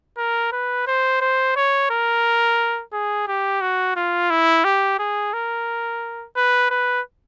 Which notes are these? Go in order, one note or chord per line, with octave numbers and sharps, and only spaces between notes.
A#4
B4
C5
C5
C#5
A#4
G#4
G4
F#4
F4
E4
G4
G#4
A#4
B4
B4